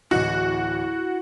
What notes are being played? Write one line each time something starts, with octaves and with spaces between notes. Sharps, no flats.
D1 E3 E4 F#4 D#5